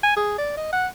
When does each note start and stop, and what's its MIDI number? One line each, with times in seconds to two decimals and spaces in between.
0.04 0.14 80
0.17 0.36 68
0.38 0.52 74
0.57 0.71 75
0.73 0.87 78